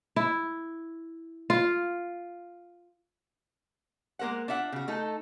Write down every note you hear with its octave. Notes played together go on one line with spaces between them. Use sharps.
E4
F4
G#3 A#3 A#4 C5 F#5
D4 F4 E5 F#5
C#3 F#4
A3 D#4 A4